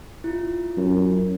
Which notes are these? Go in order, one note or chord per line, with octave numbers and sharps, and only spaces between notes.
E4 F4
F#2